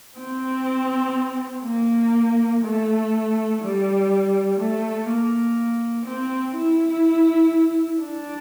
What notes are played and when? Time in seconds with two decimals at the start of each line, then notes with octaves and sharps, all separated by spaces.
0.19 C4
1.65 A#3
2.64 A3
3.62 G3
4.59 A3
5.08 A#3
6.06 C4
6.55 E4
8.02 D4